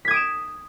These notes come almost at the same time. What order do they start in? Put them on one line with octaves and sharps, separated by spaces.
B6 G#6 D#6 D7 E7